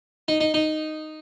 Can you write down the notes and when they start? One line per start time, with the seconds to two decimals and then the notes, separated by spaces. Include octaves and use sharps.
0.28 D#4
0.40 D#4
0.54 D#4